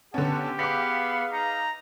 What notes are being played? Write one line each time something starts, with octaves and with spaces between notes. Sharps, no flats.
D3 B3 C#4 G4 F#5 A5
B3 G#4 B4 F5 D6 B6
D#4 A#5